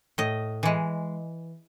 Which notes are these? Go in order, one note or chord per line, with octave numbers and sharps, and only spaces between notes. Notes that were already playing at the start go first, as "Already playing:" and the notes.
A2 D#5
E3 G#3